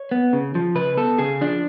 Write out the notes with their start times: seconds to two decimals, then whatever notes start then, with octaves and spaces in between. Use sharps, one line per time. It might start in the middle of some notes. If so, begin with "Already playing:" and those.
Already playing: C#5
0.11 B3
0.33 C#3
0.55 F3
0.75 C#3 B4
0.97 B3 A4
1.18 C#3 G#4
1.41 F3 D4